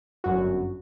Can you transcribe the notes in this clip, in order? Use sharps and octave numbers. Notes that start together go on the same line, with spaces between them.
G1 F#2 F#4